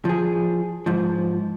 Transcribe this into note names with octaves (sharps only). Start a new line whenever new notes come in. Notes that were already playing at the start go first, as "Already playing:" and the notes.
F3 G#4
G#2 F3